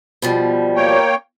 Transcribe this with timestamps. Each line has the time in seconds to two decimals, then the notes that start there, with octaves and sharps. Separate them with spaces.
0.22 B2 F3 G3
0.76 A#3 C#5 G5